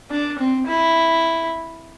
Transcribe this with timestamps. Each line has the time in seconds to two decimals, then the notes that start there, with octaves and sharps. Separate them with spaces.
0.10 D4
0.39 C4
0.67 E4